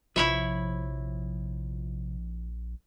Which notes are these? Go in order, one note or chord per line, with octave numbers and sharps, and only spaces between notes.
A#1 C3 F3 E4 C#5 E5 B5